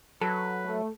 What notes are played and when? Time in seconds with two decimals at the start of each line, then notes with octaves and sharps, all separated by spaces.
0.21 F#3 A4 B4
0.65 A3